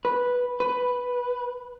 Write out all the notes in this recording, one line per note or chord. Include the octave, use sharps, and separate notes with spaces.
B4
B4